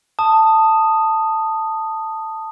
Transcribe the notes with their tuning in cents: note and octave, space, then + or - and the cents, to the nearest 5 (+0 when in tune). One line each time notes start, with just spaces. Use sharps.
A5 +10 D#6 -5